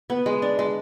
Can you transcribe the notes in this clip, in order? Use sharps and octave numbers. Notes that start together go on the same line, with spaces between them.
B3
G#3
D4
G#3